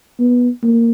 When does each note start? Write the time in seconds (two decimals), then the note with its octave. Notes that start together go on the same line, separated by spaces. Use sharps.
0.19 B3
0.63 A#3